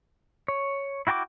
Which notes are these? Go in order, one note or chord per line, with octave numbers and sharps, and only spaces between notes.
C#5
E4 F#4 G5 A5 D6